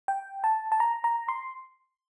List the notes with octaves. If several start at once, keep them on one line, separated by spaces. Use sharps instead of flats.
G5
A5
A5
A#5
A#5
C6